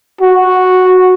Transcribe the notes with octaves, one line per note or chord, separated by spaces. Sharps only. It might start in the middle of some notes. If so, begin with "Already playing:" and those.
F#4